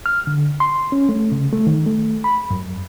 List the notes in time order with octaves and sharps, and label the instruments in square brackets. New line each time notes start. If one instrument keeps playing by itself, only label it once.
[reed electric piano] F6
D3
C6
C#4
A3
C#3
A3
D#3
A3
B5
F#2